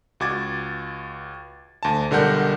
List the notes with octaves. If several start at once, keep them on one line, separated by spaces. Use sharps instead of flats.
C#2 F#4 D6 G#6 A6
D2 A5
B1 D3 G3 A#4 F#5 G6